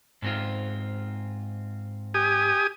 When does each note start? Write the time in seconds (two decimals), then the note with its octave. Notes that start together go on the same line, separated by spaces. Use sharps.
0.22 G#2 C4 F4
2.14 G4 G#5 D#6